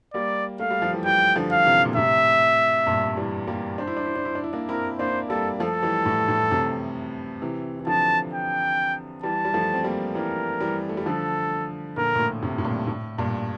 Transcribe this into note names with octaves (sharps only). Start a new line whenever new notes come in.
G3 A#3 D5
A3 F5
G3
F3
E3 G3
E3 G3 G5
D3 F3
F5
C3 E3
A#2
A2 C3 E5
G2 A#2
E3 G3
G3 A#3
D4 C5
E4
D4
E4
D4
E4
D4
E4
A#3 D4
C4 E4 A#4
A#3 D4 C5
G3 A#3 A4
F3 A3 A4
E3 G3
A2
A2
A2 C3
C3 E3
E3
D3 F3 A5
G5
E3 G3 A5
G3
F3 A3
C4
G3 A#3
E3 G3 A#4
E3 G3
A3
G3
D3 F3 A4
A#2 D3 A#4
A#2
A2
A2 C3
A2
G2 A#2
A2
G2 A#2